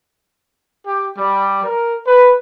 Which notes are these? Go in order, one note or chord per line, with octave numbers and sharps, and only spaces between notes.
G4
G3
A#4
B4